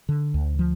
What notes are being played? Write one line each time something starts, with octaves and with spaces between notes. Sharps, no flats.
D3
D2
F3